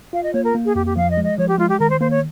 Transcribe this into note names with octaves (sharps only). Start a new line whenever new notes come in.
F4 F5
D#5
A#3 C#5
A#4
A#3
G#4
F2 G4
G4
F3 F5
D#5
G#3
D#5
F3 C#5
G4
G#3 F4
G4
D#3 A#4
C5
A#3 C5
C#5